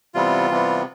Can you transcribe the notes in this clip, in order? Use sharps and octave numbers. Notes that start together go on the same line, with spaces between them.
C3 E3 G3 B3 F4
C3 E3 G3 B3